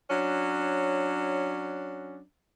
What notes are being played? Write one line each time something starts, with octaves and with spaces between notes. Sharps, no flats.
F#3 C#4 D4